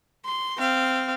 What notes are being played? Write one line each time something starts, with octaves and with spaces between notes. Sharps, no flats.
C6
C4 F5